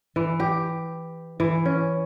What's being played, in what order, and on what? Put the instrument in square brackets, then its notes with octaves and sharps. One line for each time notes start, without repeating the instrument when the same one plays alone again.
[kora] E3
G4
E3
C#4